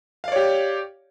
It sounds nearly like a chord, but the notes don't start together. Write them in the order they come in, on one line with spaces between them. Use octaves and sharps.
F5 D5 C#5 G4